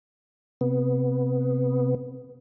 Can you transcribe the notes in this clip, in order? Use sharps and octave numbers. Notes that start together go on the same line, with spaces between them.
C3 B3